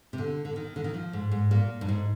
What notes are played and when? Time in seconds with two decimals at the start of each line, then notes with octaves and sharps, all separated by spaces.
0.13 C3
0.18 D3
0.45 D3
0.56 D#3
0.76 D3
0.84 D#3
0.94 F3
1.13 G#2
1.31 G#2
1.51 A#2
1.81 G2
1.88 G#2